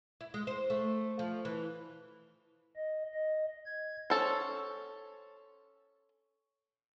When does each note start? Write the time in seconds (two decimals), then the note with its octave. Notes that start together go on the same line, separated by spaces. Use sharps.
0.21 E4
0.34 G#3
0.47 C5
0.70 A3
1.19 F3
1.45 E3
2.76 D#5
3.14 D#5
3.66 G#6
4.10 C#4 A4 C5